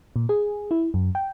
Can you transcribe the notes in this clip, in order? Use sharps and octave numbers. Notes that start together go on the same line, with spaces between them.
A#2
G#4
E4
F#2
G5